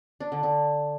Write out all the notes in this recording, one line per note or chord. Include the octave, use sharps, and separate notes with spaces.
D4
D3
D3